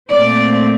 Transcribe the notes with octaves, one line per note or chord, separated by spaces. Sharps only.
A#2 A3 C4 D5